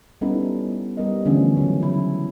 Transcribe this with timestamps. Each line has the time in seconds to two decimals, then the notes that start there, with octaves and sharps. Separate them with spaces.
0.21 G3 B3 C#4 D#4 E4 A4
0.69 B3
0.97 G3 B3 D#4 A#4 D#5
1.25 D3 E3 F3 A3 B3 C#4
1.57 C#3 F#3
1.80 F#3 C#4 E4